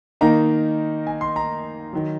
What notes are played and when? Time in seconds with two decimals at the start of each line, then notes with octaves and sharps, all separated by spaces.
0.21 D#3 A#3 D#4 A#5
1.07 G#5
1.21 C6
1.36 A#5
1.93 D#3 F#3